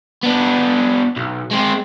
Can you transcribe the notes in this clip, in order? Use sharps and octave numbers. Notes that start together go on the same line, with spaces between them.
B3 D4
B1
G#3 C4